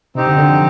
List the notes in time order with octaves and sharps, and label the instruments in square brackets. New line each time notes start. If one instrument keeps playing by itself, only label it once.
[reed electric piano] C3 [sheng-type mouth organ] C4 D#4 G4
[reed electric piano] D3
D3
F3